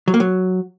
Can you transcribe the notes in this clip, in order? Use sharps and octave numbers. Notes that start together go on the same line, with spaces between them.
F#3
A#3
F#3